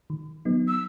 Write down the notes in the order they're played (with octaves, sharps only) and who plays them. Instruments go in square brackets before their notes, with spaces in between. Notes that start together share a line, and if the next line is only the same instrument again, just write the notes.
[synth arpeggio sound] D#3
F#3 B3 D#4
[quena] E6